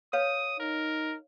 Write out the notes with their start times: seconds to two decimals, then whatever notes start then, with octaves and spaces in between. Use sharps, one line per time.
0.13 B4 C#5 F5 D#6
0.60 D#4 A#4